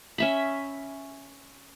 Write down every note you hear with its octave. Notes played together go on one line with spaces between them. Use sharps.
C#4 E5 B5